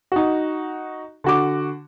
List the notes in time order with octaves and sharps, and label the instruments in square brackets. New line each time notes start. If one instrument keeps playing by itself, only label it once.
[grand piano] D#4 F#4
D3 F#4 D6